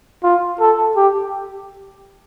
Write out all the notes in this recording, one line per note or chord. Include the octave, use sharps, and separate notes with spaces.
F4
A4
G4